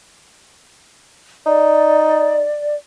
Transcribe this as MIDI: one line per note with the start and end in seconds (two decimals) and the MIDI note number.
1.46 2.45 63
1.46 2.75 74